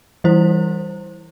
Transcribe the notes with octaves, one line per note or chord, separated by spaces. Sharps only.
E3 G3 E4 C5